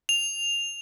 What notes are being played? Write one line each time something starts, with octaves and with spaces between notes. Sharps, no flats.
F7